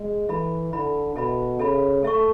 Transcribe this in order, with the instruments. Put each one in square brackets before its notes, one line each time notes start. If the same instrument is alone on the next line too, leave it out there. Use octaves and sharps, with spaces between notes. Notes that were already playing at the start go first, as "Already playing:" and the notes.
Already playing: [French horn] G#3
[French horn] E3 [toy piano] E4 A4 E5 B5
[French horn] D3 [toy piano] E4 A4 E5 B5
[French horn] B2 [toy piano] A4 E5 B5
[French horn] C#3 [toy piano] A4 E5 B5
[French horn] A3 [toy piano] A4 E5 A5 C#6